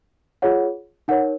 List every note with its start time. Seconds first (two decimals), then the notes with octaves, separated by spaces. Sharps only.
0.42 F4 G#4 C#5 F#5
1.08 D#4 A#4 C#5 F#5